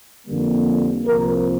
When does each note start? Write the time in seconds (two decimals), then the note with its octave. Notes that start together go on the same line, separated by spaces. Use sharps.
0.27 F2 D3 G3 A#3
1.06 C2 C3 F3 A#3 A#4